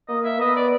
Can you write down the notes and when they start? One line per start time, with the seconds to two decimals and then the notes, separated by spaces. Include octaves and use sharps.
0.08 A#3 D#5
0.25 E5
0.40 B3 D#5
0.56 D5